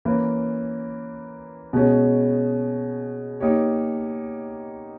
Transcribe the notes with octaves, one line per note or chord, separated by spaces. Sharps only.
E3 A#3 C#4
B2 G#3 C#4
A#3 D#4 G4 C#5